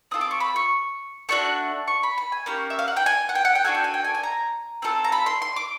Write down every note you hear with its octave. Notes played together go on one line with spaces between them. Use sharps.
C4 F4 A4 D#6
D6
C#6
B5
C#6
A3 D4 F#4 C#6
C#6
B5
B5
G#5
A#3 C#4 G4 A#5
E5
F5
F#5
G5
G#5
F#5
G5
F#5
G5
D4 F#4 A4 G#5
G5
G#5
G5
G#5
G#5
A#5
C4 F4 A4
A#5
B5
C6
C6
D6